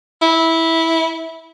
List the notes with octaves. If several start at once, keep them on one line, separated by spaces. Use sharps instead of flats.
E4